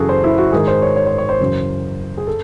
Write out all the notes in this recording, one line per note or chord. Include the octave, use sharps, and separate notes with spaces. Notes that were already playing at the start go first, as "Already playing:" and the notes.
Already playing: F#2 C#3 E3 F#4 G#4 A4
C5
E4
F#4
G#2 D#3 G#4
C5
C#5
C#5
C5
C#5
C5
F#2 C#3 E3
G#4
A4